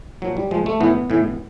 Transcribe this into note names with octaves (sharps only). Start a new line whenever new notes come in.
A#2 F3 F#3
G3
A#2 F3 G#3
A3
A2 E3 B3
A2 E3